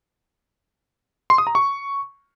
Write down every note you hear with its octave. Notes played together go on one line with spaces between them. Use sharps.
C6
D#6
A#5
C#6